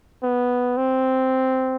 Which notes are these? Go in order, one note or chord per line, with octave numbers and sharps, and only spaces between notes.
B3
C4